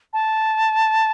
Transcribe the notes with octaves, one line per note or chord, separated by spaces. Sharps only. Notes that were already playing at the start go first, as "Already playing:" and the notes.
A5